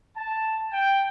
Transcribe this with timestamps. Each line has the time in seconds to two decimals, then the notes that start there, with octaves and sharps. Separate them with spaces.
0.17 A5
0.73 G5